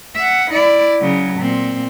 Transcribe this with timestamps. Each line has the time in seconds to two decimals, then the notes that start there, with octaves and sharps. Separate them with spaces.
0.16 E5 F#5
0.51 E4 D5
1.00 C#3 F#3
1.40 A#2 C4